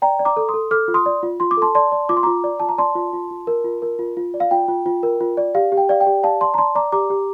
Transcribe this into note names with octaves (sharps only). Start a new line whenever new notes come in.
D5 G5 A#5
D5
A#5 D6
A4
C6 D#6
A4
A4 D6 F6
F4
C6 D#6
D5
F4
F4 C6
D6
A4 A5 C6
D5 A5 C6
D5
F4 D6
C6
F4 A#5 D6
D5
F4 A5
A#5
D5 A5 C6
F4
F4
F4
A#4
F4
A#4
F4
F4
D5
F5
F4 G5
F4
F4
A#4
F4
D5
G4 F5
G4
G5
D5 F5
G5
G4
D5 F5 A5
D5 A5 C6
A#5
D5 A5 C6
D5 A#5 D6
G4 A#5 D6
G4